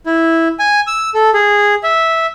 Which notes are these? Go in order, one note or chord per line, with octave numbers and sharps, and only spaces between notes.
E4
G#5
E6
A4
G#4
E5